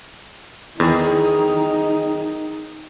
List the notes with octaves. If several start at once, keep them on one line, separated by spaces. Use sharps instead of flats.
E2 D#3 D#4 G#4